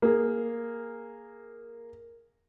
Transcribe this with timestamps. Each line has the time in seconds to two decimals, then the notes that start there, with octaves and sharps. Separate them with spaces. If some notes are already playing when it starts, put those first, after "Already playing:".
0.02 A#3 G#4